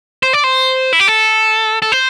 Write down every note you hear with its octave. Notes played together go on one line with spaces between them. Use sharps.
C5
D5
C5
E4
G4
A4
A4
C5